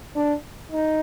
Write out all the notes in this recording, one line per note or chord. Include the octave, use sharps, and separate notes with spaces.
D4
D#4